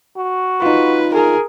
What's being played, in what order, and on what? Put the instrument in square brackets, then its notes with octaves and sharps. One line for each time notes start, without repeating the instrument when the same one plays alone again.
[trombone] F#4
[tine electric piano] D#4 F4 [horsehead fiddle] B4
[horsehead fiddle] G#4 A#4